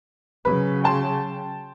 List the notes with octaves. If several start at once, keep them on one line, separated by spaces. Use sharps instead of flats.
C#3 F#3 B4
G5 A5 C6